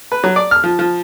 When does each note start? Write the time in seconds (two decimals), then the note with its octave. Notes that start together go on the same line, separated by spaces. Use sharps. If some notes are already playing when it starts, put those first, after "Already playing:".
0.12 B4
0.24 F#3
0.36 D5
0.51 F6
0.64 F3
0.79 F3